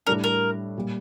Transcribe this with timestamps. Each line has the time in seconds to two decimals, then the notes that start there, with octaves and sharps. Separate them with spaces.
0.07 A2 G3 D4 A#4
0.24 A#4
0.78 A#2 G3